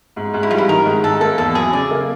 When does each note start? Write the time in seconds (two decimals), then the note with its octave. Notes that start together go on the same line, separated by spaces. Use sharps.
0.16 G#2
0.34 G#2
0.43 E4
0.51 G3 F4
0.58 E4
0.68 D#3 A#4
0.86 G#2
1.03 G#2 A4
1.20 A#3 A4
1.38 E2 A4
1.55 F#3 G#4
1.73 C#3 D5
1.91 A#3